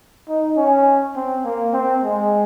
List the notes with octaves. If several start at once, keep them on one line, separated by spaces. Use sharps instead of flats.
D#4
C#4
C4
A#3
C4
G#3